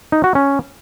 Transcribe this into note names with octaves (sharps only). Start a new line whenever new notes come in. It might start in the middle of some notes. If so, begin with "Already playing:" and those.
D#4
F#4
C#4